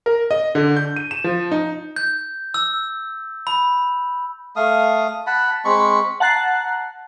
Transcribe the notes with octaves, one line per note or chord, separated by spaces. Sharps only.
A#4
D#5
D3
G6
D#7
E7
F3
D#4
G6
E6
B5
A3 F5 D#6
F#5 A5 B5
G#3 C4 B5 C#6
F#5 A5 A#5 F#6 A6 C7